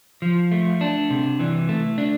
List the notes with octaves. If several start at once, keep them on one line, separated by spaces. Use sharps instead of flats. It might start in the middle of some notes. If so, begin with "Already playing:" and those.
F3
A3
D4
C3
E3
A3
D4